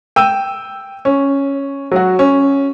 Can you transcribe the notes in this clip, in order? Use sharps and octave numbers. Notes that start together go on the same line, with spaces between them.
G5 E6 D#7
C#4
F#3 F#4
C#4